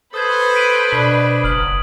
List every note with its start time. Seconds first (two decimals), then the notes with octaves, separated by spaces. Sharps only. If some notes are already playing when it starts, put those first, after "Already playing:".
0.14 A4 B4 C5 D#6 G#6
0.55 B6 D7 D#7
0.92 B2 D4 C5
1.44 F#1 D#6 F6 F#7